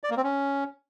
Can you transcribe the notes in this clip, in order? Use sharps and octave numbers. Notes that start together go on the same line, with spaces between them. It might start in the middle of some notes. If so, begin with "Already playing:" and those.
D5
A#3
C4
C#4